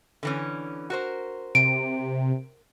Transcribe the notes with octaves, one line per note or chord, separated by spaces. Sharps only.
D3 E3 C#4
F#4 A#4 C5
C3 D7